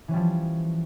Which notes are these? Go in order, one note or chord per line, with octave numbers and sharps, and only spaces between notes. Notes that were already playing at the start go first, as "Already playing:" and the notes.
E3 F3 G3 C#4